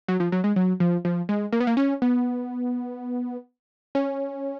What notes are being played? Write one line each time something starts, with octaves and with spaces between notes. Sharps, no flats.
F#3
F3
F#3
G#3
F#3
F3
F3
G#3
A#3
B3
A#3
C#4
B3
C#4